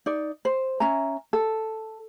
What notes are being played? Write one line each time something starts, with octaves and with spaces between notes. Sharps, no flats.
D#4 D5
C5
C#4 E5 G#5 A#5
A4